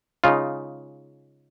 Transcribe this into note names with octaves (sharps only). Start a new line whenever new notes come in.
C#3 G#3 D#4 F4